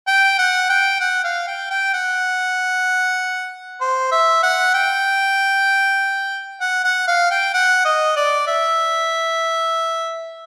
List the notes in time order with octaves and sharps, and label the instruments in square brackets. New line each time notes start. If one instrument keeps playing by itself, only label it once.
[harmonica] G5
F#5
G5
F#5
F5
G5
G5
F#5
C5
E5
F#5
G5
F#5
F#5
F5
G5
F#5
D#5
D5
E5